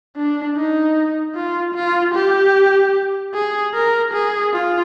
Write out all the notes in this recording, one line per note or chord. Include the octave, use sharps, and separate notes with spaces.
D4
D#4
F4
F4
G4
G#4
A#4
G#4
F4